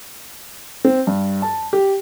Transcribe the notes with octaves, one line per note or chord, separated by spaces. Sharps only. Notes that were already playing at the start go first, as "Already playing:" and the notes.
C4
G2
A5
G4